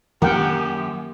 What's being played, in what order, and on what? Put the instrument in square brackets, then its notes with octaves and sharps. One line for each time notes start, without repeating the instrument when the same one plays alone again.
[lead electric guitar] F#2 [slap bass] D#3 A#3 D4 [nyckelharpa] G4 [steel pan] A#4 F#5 G5